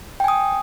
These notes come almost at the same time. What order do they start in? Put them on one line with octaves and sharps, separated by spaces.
G5 G#5 D#6